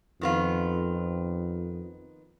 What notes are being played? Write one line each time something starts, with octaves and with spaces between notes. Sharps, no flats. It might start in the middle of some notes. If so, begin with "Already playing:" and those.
F2 D#3 B3 F4